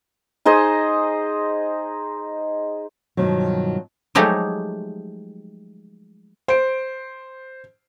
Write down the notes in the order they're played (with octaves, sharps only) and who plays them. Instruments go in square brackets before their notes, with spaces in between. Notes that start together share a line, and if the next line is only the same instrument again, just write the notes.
[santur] D#4 G#4 C5 D#5
[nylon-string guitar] G2 B2 D#3 F3 F#3
[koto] F3 F#3 G#3 A3 D#4 G4
[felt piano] C5 D7